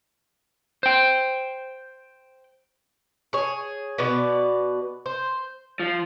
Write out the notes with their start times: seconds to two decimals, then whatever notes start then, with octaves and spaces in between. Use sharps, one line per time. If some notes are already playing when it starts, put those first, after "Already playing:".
0.83 C5 G5
3.33 G#4 C#5
3.98 B2 B3 D5
5.06 C5
5.80 F3